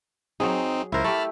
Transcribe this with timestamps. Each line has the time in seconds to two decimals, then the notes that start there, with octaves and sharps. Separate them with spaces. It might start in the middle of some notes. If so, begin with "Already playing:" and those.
0.40 F#3 C4 D#4 G#4
0.92 C#2 E4 A#4 C5
1.04 A3 G4 A5 B5 F6